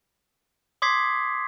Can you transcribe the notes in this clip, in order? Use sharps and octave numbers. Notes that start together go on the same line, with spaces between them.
C6 D6 D#6 G#6 B6 C7